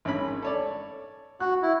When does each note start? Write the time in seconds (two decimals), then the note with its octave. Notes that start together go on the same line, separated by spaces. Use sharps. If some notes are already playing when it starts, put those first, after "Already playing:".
0.05 G#1 C#4 B5
0.43 A4 C#5 D5
1.40 F#4 F#6
1.62 E4